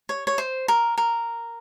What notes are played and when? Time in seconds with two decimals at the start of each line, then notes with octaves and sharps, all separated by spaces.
0.09 C#5
0.27 C#5
0.38 C5
0.68 A#4
0.98 A#4